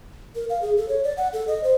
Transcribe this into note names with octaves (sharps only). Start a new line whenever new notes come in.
A#4
F5
G#4
A4
C#5
D5
F#5
A4
D#5
C5